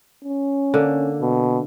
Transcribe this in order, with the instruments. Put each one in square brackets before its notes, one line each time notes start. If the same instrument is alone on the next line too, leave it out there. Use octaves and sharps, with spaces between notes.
[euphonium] C#4
[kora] D3 A#3
[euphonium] B2